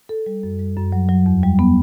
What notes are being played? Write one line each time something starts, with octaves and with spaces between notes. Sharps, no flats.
A4
G3
F#2
G3
F#2
F#3
F#3
E2
G3
B3